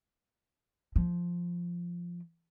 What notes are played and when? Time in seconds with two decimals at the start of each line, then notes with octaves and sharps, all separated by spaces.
0.96 F3